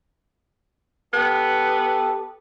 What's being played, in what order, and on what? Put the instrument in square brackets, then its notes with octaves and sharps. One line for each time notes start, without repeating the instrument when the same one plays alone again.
[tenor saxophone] B3 [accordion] G4 A4